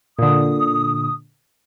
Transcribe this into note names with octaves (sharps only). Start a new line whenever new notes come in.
A#2 D3 D#6